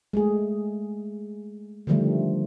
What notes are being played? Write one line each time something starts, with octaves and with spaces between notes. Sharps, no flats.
G#3 A3 G#4
D3 D#3 F3 G3 A3